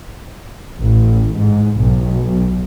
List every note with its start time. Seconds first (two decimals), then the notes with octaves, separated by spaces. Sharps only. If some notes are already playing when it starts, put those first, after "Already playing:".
0.78 A1
1.37 G#2
1.80 B1